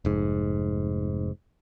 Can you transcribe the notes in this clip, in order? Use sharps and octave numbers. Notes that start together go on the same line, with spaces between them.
F1 G#2